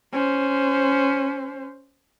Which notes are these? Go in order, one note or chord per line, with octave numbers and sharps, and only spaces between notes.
C#4 C5